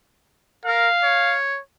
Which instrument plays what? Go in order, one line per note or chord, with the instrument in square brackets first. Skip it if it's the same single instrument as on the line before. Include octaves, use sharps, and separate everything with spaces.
[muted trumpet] A#4 [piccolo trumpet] F5
[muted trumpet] C#5